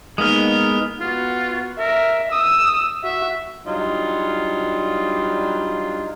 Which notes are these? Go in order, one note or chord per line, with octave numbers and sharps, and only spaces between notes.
G#3 A#3 B3 D#4 D#6 F6
B3 F4 F#4
A#4 E5
D#6 E6
F#4 E5
F#3 G3 D4 D#4 F4